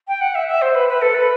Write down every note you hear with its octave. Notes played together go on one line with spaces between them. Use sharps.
G5
F#5
E5
E5
C5
B4
B4
A4
B4